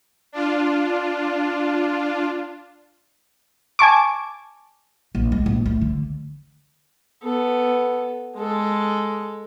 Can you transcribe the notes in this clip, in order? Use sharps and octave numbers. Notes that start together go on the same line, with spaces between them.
D4 F4
G#5 A5 C#6 D6
A#1
G#3
A#1
A3
D3
B3 A4
G#3 A4